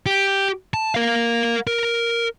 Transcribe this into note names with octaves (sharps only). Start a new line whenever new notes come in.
G4
A5
A#4 F5
A#4